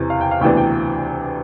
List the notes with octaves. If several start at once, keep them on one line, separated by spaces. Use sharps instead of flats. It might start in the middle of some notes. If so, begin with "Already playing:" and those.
Already playing: E2 C3 E3
F5
G5
F5
D2 C3 E3 B3 D4 G5
G5